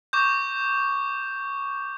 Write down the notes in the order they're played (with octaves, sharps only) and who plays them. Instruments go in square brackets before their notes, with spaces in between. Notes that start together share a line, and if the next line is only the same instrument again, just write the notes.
[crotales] C#6 D6 G6